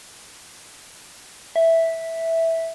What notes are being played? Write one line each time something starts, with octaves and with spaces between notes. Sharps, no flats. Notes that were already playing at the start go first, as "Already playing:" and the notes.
E5